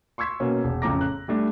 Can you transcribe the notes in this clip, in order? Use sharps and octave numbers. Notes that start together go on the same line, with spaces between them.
C6 C#6 E6 G#6 B6
B2 A#3 C#4
E1
A1 F2 C#3 A#5 D6 A#6
F#6
G3 A3 D4